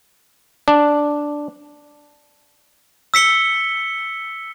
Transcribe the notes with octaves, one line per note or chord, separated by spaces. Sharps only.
D4
E6 B6 C#7 G7